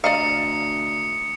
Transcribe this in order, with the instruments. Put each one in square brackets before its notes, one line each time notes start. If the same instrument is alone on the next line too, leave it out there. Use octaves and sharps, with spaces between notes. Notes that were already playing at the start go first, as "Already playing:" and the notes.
[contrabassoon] D2 [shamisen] D5 D#5 F5 [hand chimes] A#5 [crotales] D#6 C#7